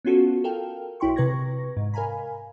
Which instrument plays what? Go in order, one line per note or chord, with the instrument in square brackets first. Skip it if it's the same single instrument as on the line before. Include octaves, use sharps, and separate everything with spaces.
[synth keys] B3 C#4 F4 F#4 A4
A4 A#4 F5 G5
B1 E4 G5 C6 C#6
C3 B4 C#6 G#6 A#6
G#2
A#4 F5 G#5 A#5 B5